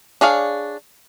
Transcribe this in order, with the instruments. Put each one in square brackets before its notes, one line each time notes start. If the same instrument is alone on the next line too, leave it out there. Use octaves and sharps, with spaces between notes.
[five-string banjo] D4 G#4 C#5 F5